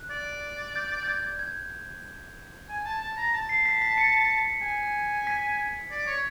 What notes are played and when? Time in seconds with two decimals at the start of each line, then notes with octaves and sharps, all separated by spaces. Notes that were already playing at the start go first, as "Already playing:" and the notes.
Already playing: F#6
0.10 D5
0.76 G6
1.03 G6
1.08 G#6
1.39 G#6
2.69 G#5
2.85 A5
3.01 A5
3.17 A#5
3.33 A5
3.49 C7
3.65 B6
3.82 B6
3.98 C#7
4.62 G#5
5.27 B6
5.91 D5
6.07 C#5